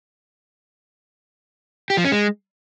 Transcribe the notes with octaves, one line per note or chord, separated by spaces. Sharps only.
G4
F3
C#4
G#3